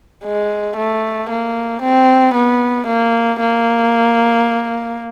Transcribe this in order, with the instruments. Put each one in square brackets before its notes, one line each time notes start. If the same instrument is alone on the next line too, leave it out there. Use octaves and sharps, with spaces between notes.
[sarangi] G#3
A3
A#3
C4
B3
A#3
A#3